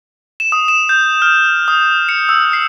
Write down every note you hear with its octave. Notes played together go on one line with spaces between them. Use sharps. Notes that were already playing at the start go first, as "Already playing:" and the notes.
E7
D#6
E7
G6
F6
D#6
C#7
E6
C7